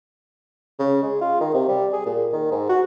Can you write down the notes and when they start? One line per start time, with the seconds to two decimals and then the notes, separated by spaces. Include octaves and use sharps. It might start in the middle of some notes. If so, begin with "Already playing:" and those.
0.79 C#3
1.03 G#3
1.21 F4
1.40 D#3
1.54 C3
1.68 G3
1.92 G#4
2.06 A#2
2.32 D#3
2.51 G#2
2.69 F#4